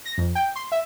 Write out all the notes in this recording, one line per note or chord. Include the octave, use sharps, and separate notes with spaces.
A#6
F2
G5
C6
E5